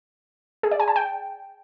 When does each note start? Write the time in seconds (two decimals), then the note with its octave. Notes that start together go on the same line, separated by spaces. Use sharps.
0.63 G#4
0.71 D5
0.80 G#5
0.88 A5
0.96 G5